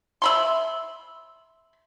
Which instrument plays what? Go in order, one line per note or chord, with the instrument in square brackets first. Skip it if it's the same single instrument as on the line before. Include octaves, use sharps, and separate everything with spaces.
[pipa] E5 B5 C6